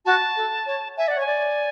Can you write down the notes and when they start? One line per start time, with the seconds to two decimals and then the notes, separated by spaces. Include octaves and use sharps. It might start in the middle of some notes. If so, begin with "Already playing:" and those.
0.05 F#4 A5
0.36 A4
0.66 C#5
0.97 E5 G#5
1.08 D5 F#5
1.17 C#5 G#5
1.27 D5